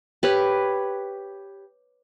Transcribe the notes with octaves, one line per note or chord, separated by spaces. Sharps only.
G4 B4 C#5